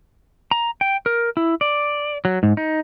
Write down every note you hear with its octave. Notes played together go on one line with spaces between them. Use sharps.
A#5
G5
A#4
E4
D5
F#3
G#2
D#4